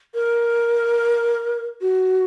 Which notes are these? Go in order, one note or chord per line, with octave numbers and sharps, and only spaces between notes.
A#4
F#4